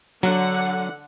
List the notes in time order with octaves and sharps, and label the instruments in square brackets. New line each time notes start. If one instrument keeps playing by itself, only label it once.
[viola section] D3 F#5 [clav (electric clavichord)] F#3